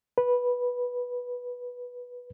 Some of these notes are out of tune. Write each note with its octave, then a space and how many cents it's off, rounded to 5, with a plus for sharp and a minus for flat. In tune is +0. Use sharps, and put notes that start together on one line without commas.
B4 -10